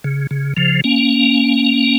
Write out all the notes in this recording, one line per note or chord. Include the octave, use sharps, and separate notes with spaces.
C#3
C#3
C#3 F3
A#3 C#4